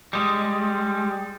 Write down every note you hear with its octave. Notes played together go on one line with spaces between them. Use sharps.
G3 G#3